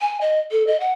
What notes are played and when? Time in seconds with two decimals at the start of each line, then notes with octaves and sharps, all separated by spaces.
0.01 G#5
0.21 D#5
0.51 A4
0.67 D#5
0.80 F#5